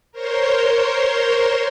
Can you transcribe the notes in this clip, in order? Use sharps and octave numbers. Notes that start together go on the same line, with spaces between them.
A#4 C5 C#5 C6